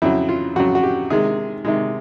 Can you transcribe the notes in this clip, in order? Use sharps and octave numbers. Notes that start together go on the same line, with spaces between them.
F2 C#3 F#3 E4
F4
F2 C#3 F#3 F#4
F#4
G4
C3 D#3 G#3 G#4
C3 D#3 G#3